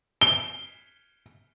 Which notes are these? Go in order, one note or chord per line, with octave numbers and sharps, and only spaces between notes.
G7